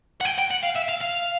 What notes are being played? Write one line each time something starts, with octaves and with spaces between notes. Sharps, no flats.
F#5
G5
G5
F#5
F5
E5
F5
F5